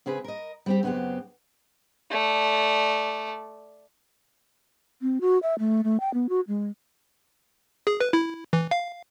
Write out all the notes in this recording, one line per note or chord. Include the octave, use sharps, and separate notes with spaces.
C#3 C4 G#4 B4
A#4 D#5
G3 C4 G4
F#2 C#3 B3 C4 G4
A3 D5
C4
F#4
E5
A3
A3
G5
B3
F#4
G#3
G#4
B4
E4
E3
F5